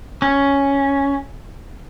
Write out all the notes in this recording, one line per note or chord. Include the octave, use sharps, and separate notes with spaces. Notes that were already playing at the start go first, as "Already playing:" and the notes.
C#4